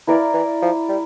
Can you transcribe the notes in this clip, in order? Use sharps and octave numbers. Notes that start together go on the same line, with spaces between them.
E3 E4 A#4 D5 F5
E3
F3
G3